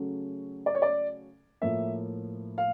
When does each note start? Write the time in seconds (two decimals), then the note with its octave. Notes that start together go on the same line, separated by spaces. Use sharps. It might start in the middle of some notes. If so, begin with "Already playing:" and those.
Already playing: C#3 F#3 A3 C#4
0.66 D5
0.75 C#5
0.82 D5
1.62 A2 F3 A#3 E5
2.58 F5